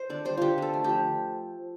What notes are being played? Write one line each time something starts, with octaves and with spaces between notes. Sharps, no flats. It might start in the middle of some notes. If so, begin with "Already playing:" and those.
Already playing: C5
D3 D5
G3 C5
D3 F4 G4
D3 A4
A3
F3 G4